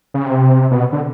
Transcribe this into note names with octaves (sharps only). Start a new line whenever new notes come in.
C#3
C3
B2
D3